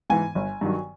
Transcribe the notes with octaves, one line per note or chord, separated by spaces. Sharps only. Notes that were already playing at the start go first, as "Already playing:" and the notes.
G#2 E3 G#5
G1
G2 D#3 F#3